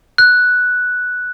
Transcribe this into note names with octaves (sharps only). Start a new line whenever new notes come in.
F#6